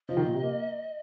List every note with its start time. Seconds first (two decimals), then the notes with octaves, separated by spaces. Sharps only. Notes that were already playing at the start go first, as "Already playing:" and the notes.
0.08 F3 D#5
0.17 D#3
0.25 A#2
0.34 C3
0.43 A#3